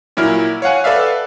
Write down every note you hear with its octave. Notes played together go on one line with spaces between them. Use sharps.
A#2 F#3 E4 F6
C#5 F5 F#5 G#5
A4 B4 D5 E5 F5